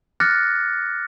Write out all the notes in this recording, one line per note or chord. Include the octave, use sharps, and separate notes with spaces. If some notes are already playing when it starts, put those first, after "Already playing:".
D6 F6 F#6 A6 A#6 C#7